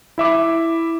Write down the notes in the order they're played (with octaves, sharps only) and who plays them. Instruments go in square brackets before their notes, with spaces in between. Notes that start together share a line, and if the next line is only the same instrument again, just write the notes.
[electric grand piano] E4 E5 D6